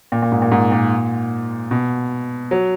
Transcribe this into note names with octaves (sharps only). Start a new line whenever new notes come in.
A#2
A#2
G#2
A#2
G#2
A#2
B2
F#3